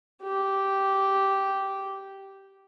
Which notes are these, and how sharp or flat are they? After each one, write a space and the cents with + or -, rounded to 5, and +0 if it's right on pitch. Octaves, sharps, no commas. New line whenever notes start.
G4 -10